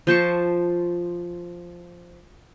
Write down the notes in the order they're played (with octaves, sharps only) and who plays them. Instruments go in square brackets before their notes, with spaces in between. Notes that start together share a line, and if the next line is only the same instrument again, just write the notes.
[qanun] F3 C5 A5 C#6